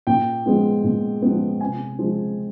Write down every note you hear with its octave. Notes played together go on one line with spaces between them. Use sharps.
A#2 G5
F3 G#3 B3
A#2
F3 G#3 B3
C3 G#5
F3 G#3